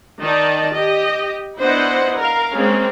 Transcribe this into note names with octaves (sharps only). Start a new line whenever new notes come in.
D#3 D#4 D5 D#5 A5
G4 D#5
B3 D4 E4 C5 D#5 F#5
A#4 F5
G#3 A#3 C4 C#4